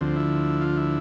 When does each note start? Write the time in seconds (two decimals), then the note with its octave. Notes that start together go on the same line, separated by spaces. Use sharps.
0.01 D2 D3 F3 C4
0.16 E4
0.61 F4
0.77 E4